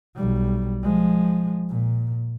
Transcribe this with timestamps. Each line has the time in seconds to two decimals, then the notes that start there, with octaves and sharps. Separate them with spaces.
0.15 B1 G3
0.82 F3 G#3
1.69 A#2